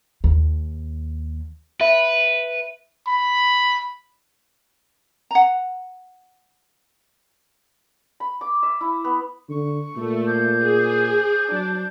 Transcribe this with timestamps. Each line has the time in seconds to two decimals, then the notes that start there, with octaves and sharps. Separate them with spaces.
0.24 D#2
1.81 B4 E5
3.07 B5
5.31 F#5 A#5
8.20 B5
8.41 D6
8.63 E5
8.81 E4
9.04 B3
9.49 D3 C#6
9.97 A#2 A3
10.27 C5 D6 G6
10.62 G#4
11.52 F#3 D4